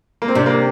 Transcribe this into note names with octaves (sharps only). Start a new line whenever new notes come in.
A#3
C4
C3 D4
A#3